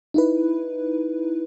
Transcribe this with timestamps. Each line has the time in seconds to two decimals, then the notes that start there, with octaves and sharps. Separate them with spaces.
0.14 D#4 E4 B4